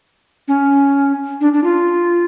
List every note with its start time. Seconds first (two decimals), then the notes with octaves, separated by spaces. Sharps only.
0.48 C#4
1.41 D4
1.53 D4
1.64 F4